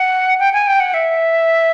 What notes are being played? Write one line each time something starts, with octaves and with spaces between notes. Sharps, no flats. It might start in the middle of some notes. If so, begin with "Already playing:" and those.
Already playing: F#5
G5
G#5
G5
F#5
E5